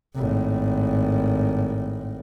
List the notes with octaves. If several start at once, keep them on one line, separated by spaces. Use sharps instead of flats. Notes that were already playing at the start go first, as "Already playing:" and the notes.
G#1 A2